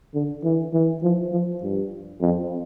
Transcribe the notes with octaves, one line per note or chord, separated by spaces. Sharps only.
D3
E3
E3
F3
F3
G2
F2